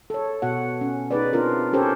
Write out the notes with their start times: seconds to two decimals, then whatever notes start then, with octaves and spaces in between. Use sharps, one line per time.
0.10 A4 C#5
0.42 B2 F#4 F#5
0.81 C#4
1.11 D#4 G#4 B4 D5
1.33 C4 D4 F4 A#4
1.73 C#4 G4 A4 A#4 C5 C#5